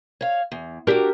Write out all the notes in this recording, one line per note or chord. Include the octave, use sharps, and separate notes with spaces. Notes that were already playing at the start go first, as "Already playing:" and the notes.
C#5 F5
E2
D4 F#4 G4 A#4